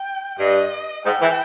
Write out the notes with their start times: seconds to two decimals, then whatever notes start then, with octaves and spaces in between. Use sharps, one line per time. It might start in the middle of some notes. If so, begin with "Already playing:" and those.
Already playing: G5
0.39 G2 D#5
1.05 G#2 G5
1.22 E3